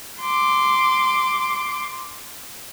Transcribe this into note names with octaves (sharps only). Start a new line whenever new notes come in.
C6 D6